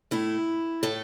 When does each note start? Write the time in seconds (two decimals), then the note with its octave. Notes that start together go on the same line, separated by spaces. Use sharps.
0.11 A2 A3 E4
0.83 A2 A3 A4